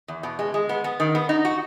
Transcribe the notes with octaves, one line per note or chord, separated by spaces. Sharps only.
E2
B2
G#3
G#3
B3
B3
D#3
B3
D#4
F#4